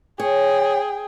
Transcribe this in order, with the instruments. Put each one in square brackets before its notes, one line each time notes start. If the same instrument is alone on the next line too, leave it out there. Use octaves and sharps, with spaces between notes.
[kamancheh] G#4 G5 [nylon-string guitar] C#5